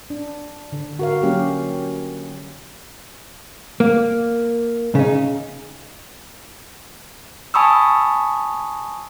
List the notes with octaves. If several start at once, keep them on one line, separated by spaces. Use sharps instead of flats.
D4
D3
F#4 A#4 F5
F#3 A#3 C#4 G4
A#3
C#3 D#4
G#5 A5 B5 C#6 D#6 E6